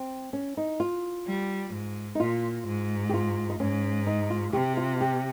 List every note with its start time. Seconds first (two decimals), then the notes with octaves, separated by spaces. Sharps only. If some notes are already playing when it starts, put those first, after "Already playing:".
Already playing: C4
0.33 C#4
0.57 D#4
0.80 F4
1.27 G3
1.73 G#2
2.15 D#4
2.19 A#2 F4
2.67 G#2
3.09 G4
3.14 F4
3.49 D#4
3.59 G#2 C#4
4.07 D#4
4.30 F4
4.53 C3 G4
4.77 F4
5.01 G4